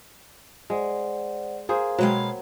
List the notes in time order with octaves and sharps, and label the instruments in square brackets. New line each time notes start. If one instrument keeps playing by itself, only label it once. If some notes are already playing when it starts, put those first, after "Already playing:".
[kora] G#3 [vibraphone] C5 D5 F#5
[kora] A#3 G#4 C5 [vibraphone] F5
[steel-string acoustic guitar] B2 G#3 F5 [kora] F#3 G5 [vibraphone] C5 B5